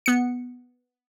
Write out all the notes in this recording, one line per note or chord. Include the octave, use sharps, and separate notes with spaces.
B3 C#7